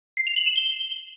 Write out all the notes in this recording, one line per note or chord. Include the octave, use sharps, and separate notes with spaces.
C7
F7
F#7
E7
G7